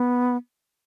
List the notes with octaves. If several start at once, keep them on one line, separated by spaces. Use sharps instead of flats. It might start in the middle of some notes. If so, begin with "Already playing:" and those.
Already playing: B3